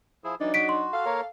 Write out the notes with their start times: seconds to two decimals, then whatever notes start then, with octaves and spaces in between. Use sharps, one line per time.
0.24 F3 E4 G#4
0.40 E3 F#3 D4 D#4 D5
0.54 F#4 B6 D7
0.69 C6
0.92 A4 F5
1.05 A#3 A#4 C#5